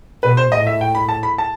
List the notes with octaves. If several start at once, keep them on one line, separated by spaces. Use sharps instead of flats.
B2 B4
C5
A2 D#5
E5
G5
B5
A5
B5
A5